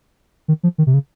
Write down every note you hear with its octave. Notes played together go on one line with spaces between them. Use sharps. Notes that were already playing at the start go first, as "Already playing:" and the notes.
D#3
F3
D#3
C3
C#3